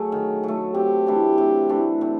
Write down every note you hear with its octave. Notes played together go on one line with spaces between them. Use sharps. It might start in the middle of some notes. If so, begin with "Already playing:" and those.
Already playing: F#3 A3 G#4
D#3
F#3 A3
C3 G4
E3 A3 D4
C3
E3 A3 D4
C3